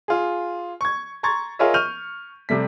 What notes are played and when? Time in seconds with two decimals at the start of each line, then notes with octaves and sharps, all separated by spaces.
0.08 F4 G#4
0.81 C#6 G#6
1.23 A#5 C6 C#6 G#6 A6
1.59 F4 G#4 A#4 C#5 D#5 E5
1.74 C#6 F6 G6 D#7 F7
2.49 C3 G3 A3 B6